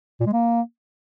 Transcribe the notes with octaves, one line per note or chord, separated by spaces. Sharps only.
A#2
G#3
A#3